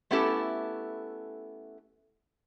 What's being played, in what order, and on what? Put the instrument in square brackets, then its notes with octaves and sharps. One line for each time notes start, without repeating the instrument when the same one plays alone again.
[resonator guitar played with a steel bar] A3 B3 C#4 E4 G4 A4